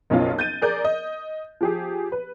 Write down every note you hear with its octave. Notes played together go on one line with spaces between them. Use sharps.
F#1 B1 C#4 F4
G6 A6 D#7
G#4 A#4 D5 G6
D#5
F3 G4 G#4
B4